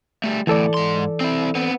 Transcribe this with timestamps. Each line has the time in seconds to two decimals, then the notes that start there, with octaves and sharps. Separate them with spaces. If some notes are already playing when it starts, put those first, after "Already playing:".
0.24 G3 A3
0.47 D2 A2 E3 A4 D5
0.74 G#2 C6
1.20 C4 E4
1.55 B3 C4